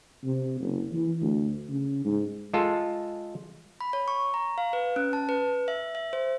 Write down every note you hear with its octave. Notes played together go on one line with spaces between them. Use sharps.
C3
F#1
E3
D2
C#3
G#2
G#3 F4 A4
B5
C#5
C#6
A#5
F5
B4
C#4
A5
B4
E5
E5
C5